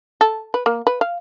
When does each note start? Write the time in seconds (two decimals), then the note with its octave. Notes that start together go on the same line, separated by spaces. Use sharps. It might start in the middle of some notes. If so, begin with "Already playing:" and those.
0.21 A4
0.54 B4
0.66 A#3
0.87 B4
1.01 F5